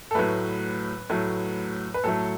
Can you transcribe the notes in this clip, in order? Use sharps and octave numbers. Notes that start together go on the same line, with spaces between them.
A4
A2 F#3 A3 B4
A2 F#3 A3
B4
A2 F#3 A3 A4